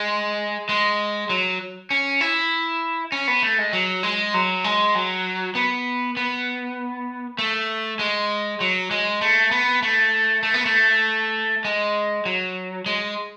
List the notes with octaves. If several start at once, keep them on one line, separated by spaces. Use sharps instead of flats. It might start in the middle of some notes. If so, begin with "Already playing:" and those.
Already playing: G#3
G#3
F#3
C#4
E4
C#4
B3
A3
G#3
F#3
G#3
F#3
G#3
F#3
B3
B3
A3
G#3
F#3
G#3
A3
B3
A3
A3
B3
A3
G#3
F#3
G#3